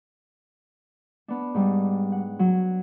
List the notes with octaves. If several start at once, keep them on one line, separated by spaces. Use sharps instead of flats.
B3 D4
G#2 G3
F#5
F#3